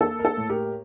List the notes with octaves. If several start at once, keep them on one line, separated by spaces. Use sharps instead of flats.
A#3 A4
A#4
A4
A2
G4 A#4